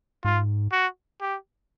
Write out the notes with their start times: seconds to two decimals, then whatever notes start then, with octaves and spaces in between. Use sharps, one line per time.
0.24 G#2 F4
0.72 F#4
1.21 G4